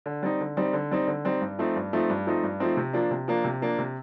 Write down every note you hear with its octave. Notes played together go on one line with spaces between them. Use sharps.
D3
G3 C4 D#4
D3
G3 C4 D#4
D3
G3 C4 D#4
D3
G3 C4 D#4
G2
F3 A3 C4 D#4
G2
F3 A3 C4 D#4
G2
F3 A3 C4 D#4
G2
F3 A3 C4 D#4
C3
F3 A#3 D4
C3
F3 A#3 D4
C3
F3 A#3 D4
C3